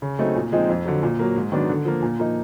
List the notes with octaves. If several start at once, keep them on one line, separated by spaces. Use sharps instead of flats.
C#3
F#3 A3 C4 D#4
A#2
F3 G#3 C4 D#4
F2
D3 F#3
A#2
F#3 A#3
G#2
D#3 F#3 B3 D4
D3
F3 A#3
A#2
F3 A#3 D#4